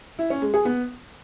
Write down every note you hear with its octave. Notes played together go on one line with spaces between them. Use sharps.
E4
C#4
G#3
G#4
B3